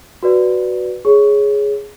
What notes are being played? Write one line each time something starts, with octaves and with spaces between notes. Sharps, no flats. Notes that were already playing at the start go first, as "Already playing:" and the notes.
F#4 B4 D5
G#4 C#5